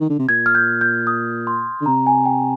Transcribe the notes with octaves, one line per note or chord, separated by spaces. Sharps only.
D#3
D3
C3
A#2 G#6
F6
G6
G6
D#6
C6
D3
C3 A#5
G#5
G5